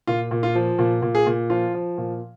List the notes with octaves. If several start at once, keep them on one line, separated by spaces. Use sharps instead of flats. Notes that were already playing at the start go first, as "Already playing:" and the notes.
A#2 F4
A#2
F4
F3
A#2
A#2
G#4
A#2
F3 F4
F3
A#2